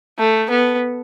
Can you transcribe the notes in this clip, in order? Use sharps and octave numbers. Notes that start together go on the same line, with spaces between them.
A3
B3